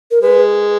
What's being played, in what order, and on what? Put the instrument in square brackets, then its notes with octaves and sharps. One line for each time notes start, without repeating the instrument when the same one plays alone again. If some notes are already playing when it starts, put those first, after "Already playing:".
[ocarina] A#4
[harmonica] G#3 [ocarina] B4